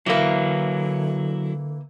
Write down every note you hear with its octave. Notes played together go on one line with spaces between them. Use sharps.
D3 E3 F#3 A#3 E4